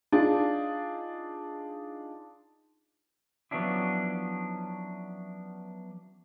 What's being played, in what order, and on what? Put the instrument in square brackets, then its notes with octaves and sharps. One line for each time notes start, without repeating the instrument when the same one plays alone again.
[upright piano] D4 D#4 F4 G#4
[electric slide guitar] F3 F#3 B3 C#4 D4 E4